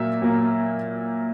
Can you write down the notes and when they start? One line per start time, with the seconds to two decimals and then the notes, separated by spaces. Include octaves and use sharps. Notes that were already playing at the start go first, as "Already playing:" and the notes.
Already playing: A#2 F#3 A#3 E5
0.22 A#2 F#3 A#3